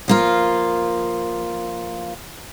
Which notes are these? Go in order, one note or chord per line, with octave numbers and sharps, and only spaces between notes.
F3 A#3 F4